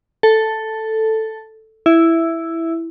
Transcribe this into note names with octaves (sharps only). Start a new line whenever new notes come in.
A4
E4